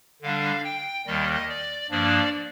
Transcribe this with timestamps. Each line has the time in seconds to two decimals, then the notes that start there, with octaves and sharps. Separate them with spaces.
0.22 D3 G3 D4 F5
0.64 G5
1.06 D#2 D#3 G3 D#5
1.49 D5
1.90 G2 F3 A#3 D4 D5